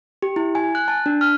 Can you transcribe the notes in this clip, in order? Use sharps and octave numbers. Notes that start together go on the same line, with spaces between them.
G4
E4
G#5
F#6
A5
D4
F6